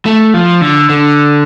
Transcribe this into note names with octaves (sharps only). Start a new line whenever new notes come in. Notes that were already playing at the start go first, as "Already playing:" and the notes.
A3
F3
D3
D3